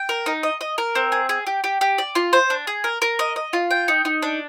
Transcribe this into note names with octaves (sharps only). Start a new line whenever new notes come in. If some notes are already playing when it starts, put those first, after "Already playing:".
Already playing: G5
A#4
D#4
D#5
D#5
A#4
C4
G#4
G#4
G4
G4
G4
D5
F4
C5
D4
G#4
A#4
A#4
D#5
D#5
F4
G5
D#4
D#4
D4